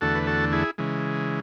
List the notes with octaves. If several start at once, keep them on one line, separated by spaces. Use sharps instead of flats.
E2 D3 A3 F#4 A4
B4
F#4 A4
E4 G#4
C#3 E3 G#3